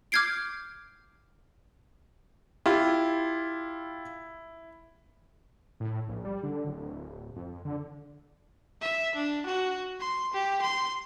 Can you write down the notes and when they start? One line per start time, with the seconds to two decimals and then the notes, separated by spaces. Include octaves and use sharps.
0.12 D6 F6 G6 G#6 C7 D7
2.66 E4 F4 G4
5.80 A2
6.08 A#1
6.25 G3
6.43 D3
6.67 D1
7.36 F2
7.65 D3
8.81 E5
9.15 D4
9.46 F#4
10.00 C6
10.33 G4
10.62 C6